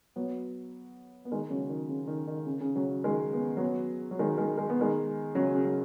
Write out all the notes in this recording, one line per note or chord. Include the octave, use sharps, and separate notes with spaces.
F#3 B3
B3
D#3 G#3
C#3 F#3
D#3
C#3
D#3
D#3
C#3
C#3
C#3 F#3
D#3 G#3
B3
F#3 B3
F#3
D#3 G#3
D#3 G#3
G#3
B3
D#3 G#3
C#3 F#3
C#3
F#3